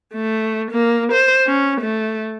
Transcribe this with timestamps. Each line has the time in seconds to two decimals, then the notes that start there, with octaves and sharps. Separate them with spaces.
0.14 A3
0.71 A#3
1.12 C5
1.47 C#4
1.81 A3